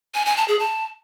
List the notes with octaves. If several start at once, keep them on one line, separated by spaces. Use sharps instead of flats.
G#5
G#5
A5
G#4
A5